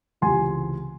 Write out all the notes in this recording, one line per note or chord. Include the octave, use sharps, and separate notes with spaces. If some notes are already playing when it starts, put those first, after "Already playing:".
C#2 C3 E3 G#5 C6